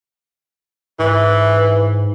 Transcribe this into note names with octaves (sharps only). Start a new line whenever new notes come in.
G#2 E3